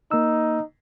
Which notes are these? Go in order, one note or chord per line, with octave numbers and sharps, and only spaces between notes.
A#3 D#4 E6